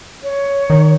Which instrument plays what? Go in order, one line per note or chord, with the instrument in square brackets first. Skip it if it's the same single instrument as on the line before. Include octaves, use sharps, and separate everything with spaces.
[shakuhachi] C#5
[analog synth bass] D#3